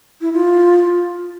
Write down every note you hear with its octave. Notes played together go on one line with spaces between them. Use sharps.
E4
F4